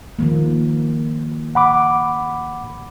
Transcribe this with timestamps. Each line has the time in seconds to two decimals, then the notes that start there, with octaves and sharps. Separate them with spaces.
0.19 D#3 F3 A#3
1.55 F#5 B5 D6